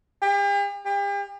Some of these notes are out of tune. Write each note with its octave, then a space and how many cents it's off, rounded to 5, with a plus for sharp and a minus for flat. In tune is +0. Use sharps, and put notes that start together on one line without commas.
G4 +45
G4 +40